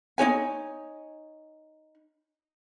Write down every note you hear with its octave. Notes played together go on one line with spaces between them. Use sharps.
D#4 F#4 C#5 G#5